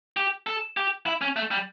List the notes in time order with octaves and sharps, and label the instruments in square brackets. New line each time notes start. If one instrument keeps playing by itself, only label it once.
[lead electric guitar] G4
A4
G4
E4
C#4
A3
G3